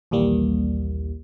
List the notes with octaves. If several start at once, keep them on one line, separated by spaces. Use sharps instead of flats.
A#1 D#2 E3 G3 A#3